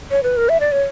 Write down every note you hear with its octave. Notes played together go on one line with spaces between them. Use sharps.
C#5
B4
A#4
E5
D5
C#5